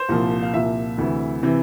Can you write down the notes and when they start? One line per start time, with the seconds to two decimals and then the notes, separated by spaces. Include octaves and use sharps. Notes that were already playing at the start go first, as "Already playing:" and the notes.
Already playing: C5
0.09 C2 A#2 F3
0.43 F5
0.53 C2 A#2 F3 E5
0.98 D2 C3 E3
1.43 C3 E3